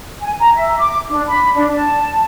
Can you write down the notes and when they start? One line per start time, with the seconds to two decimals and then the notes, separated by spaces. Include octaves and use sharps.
0.22 G#5
0.39 A#5
0.55 E5
0.78 D6
1.11 D4
1.27 B5
1.55 D4
1.74 A5